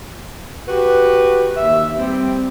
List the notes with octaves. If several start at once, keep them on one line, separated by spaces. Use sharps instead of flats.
F#4 G4 B4
D#2 E5
G3 C4